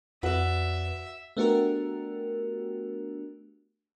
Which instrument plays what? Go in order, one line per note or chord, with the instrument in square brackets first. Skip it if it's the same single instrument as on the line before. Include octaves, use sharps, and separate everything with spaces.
[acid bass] F2 [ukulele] F#4 [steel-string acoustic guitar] B4 D5 [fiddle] E5
[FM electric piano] A3 B3 D4 F#4 G4 A#4